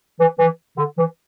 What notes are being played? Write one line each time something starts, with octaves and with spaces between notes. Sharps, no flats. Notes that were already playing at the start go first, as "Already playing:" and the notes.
E3
E3
D3
E3